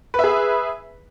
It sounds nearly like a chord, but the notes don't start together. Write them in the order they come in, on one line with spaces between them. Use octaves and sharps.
B4 E5 G#4